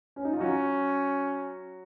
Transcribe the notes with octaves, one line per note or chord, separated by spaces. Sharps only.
C#4
D#4
F4
F#3 C#4 F#4